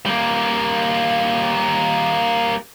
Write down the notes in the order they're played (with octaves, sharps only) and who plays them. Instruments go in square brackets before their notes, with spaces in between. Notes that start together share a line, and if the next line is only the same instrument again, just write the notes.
[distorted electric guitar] G3 A#3